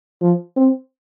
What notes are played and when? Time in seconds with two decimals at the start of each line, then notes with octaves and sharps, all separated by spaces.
0.21 F3
0.57 C4